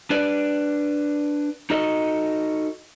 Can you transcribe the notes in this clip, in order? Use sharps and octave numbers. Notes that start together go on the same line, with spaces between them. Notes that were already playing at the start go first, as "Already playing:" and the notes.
D4 B4 D5
D#4 F#4 A4 D#5